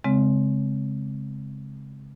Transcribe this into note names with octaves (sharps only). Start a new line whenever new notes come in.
C#3 G#3 C4